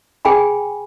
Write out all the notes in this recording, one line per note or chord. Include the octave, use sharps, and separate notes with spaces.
G#4 G5 G#5 B5